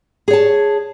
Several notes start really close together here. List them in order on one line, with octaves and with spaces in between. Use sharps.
G#4 C#5 A5